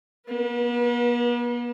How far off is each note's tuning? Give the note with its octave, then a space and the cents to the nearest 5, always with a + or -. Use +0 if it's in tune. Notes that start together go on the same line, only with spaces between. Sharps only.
B3 -45 B4 -30